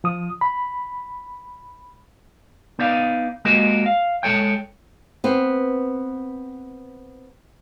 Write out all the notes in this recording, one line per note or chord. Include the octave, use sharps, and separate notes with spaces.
F3 D#6
B5
B3 D#4 D5 F5
G#3 A#3 F#4 G4 A#4 D#5
F5
G#3 A4 C#5 G5
B3 C4